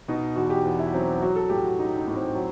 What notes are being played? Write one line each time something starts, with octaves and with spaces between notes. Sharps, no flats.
B2 D#4
E2 F#4
G4
E2
E4
F#3 C4
F#3 F#4
A4
A2 G4
F#4
F#3 D#4
D#4
A2
C4
F#3